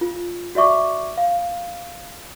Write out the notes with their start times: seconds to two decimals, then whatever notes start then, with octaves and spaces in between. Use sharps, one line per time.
0.01 F4
0.55 F#4 D5 E5 C#6 D6
1.18 F5